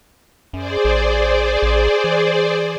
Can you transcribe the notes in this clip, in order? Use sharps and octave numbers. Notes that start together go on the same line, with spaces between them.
F#2 G#4 C5 D5
A1
A1
E3